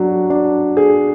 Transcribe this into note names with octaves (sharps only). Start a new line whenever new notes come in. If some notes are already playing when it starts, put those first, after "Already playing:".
Already playing: F#3 D4
D4
G#4